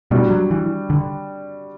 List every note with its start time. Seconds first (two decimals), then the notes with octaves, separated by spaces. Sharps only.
0.11 B2 G3 D4 F#4
0.31 F#3
0.51 E3
0.90 D3